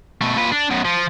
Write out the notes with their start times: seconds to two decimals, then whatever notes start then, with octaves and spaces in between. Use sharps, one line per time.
0.21 B2 A3
0.36 A#2 B4
0.52 D4
0.70 F#2 B2
0.85 F3